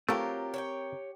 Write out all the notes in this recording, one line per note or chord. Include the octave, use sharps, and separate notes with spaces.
F#3 A3 C4 F4 G4 A#4
C#5 D#5 G5